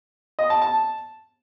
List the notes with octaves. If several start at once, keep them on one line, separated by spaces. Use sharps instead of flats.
D#5
A5
A5